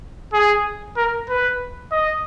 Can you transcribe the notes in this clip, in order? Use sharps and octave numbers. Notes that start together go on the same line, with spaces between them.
G#4
A#4
B4
D#5